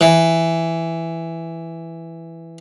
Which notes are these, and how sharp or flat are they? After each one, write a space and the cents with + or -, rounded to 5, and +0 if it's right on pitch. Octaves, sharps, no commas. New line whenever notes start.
E3 +5